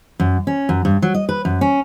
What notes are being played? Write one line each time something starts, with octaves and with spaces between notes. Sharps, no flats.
F#2
C#4
F#2
G2
F#3
D#5
B4
F#2
C#4